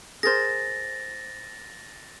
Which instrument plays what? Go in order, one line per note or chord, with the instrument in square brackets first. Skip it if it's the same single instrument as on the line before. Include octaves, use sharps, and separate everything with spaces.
[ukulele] G#4 A#4 C5 [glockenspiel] A6 A#6